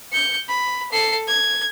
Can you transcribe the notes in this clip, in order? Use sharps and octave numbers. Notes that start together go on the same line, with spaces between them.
G6 C#7
B5
A4 C7
G#6